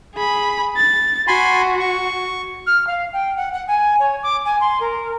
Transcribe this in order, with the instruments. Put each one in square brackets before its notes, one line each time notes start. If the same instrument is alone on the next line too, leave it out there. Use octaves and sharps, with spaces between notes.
[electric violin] G#4 B5
A6
[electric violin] F#4 [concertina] G#5 B5 C6
[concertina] C#6
[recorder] F6
F5
G5
F#5
F#5
G#5
C#5
D6
G#5
C6
A#4